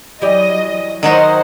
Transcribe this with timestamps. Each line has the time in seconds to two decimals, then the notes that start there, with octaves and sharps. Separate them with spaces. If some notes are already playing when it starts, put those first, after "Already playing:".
0.22 E3 F#3 G4 D5 D#5
1.03 D#3 F#3 D#4 C5 D#5 F#5